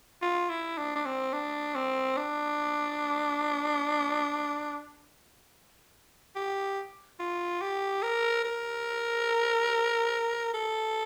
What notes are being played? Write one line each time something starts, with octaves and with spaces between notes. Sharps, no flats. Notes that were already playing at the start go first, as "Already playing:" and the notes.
F4
E4
D4
D4
C4
D4
C4
D4
G4
F4
G4
A#4
A#4
A4